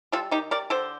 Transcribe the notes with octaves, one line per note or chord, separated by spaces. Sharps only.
G3 F4 A4
D#3 D#4 G4
G3 A#4 D5
D3 A4 C5